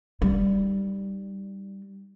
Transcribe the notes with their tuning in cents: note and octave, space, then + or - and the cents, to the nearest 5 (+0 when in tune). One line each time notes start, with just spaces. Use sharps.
G3 +0 D#4 -20